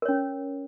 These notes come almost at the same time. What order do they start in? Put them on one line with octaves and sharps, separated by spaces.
A#4 C#5 C#4